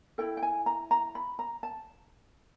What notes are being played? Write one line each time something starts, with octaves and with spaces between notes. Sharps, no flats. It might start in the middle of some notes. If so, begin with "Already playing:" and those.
E4 A4 G5
G5
G#5
A#5
A#5
B5
A#5
A5